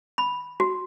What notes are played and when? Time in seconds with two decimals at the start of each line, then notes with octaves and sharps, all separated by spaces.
0.18 B5
0.60 F#4